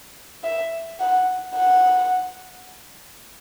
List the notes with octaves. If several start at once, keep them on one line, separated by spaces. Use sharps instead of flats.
E5
F#5
F#5